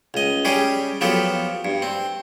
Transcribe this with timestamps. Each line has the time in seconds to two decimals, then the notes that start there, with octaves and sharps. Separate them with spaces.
0.14 C#2 D#5
0.45 G3 C#4 G4 G#4
1.01 F3 F#3 B3 G4 A4
1.65 G2
1.82 C4